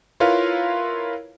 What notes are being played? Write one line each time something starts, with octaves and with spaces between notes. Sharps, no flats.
E4 F4 A#4 B4 C#5 F5